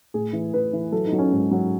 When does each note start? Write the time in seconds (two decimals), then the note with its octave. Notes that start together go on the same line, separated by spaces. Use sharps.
0.14 A2 G#4
0.33 E3
0.54 E3 B4
0.73 E3
0.92 F#3 A4
1.06 D#4
1.12 F#3
1.18 C#4
1.32 G#2
1.51 F#3